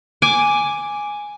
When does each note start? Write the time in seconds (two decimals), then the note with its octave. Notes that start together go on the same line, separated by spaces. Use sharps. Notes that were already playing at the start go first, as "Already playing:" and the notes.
0.22 G#5 D6